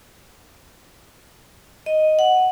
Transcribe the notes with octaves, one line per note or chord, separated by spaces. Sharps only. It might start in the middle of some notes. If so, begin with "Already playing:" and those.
D#5
F#5